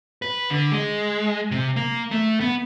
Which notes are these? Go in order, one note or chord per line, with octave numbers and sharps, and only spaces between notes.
B4
D3
G#3
C3
A#3
A3
B3